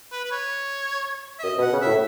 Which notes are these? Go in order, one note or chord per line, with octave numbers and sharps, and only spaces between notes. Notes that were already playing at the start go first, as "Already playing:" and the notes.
B4
B4
C#5
E5
F#2 D#5
B2
F#5
C#3
A2 E5